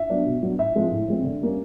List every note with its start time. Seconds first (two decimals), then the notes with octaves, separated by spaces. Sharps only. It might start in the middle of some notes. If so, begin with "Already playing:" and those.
Already playing: E5
0.10 F#3 B3 D4
0.26 B2
0.42 F#3 B3 D4
0.59 A2 E5
0.75 F3 G#3 C4
0.91 A2
1.08 F3 G#3 C4
1.24 D3
1.41 G3 A#3 C#4